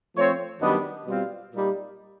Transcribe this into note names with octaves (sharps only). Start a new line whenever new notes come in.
F3 A3 C4 C#5
F#2 D#3 G3 B3 D4 D#5
B2 G3 C4 F4
A#2 G3 A#3 D#4